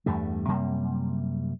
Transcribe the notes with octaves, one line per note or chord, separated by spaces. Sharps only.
E2 G2 G3 A3
F#2 C3 G3 A#3